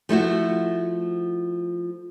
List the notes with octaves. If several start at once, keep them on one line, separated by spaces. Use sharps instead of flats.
F3 A3 E4 F#4